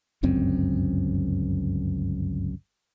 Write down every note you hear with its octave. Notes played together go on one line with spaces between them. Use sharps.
G1 C#2 F#2 C4